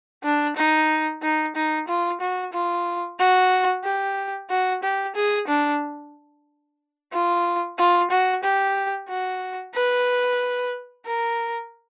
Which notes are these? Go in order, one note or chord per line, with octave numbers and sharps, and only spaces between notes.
D4
D#4
D#4
D#4
F4
F#4
F4
F#4
G4
F#4
G4
G#4
D4
F4
F4
F#4
G4
F#4
B4
A#4